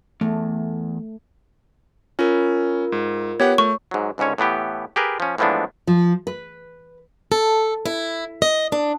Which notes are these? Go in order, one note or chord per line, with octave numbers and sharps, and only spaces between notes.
E2 A3
C#4 F4 A#4
G#2
B3 G4 C#5 F#5
A3 C#6
G#2 F#3
C#2 G#2 D3 C#4 C#5
A2 E3 B3 G4
G4 G#4 A#4 B4
F3 C#4
A2 E3 F3 G#3 B3 D4
F3
B4
A4
E4
D#5
D4